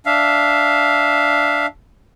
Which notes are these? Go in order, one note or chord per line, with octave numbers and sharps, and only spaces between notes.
D4 E5 F5